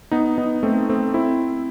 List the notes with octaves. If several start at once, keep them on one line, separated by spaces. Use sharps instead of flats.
B3 D#4
B3 D#4
A3 C4
A3 C4
C4 E4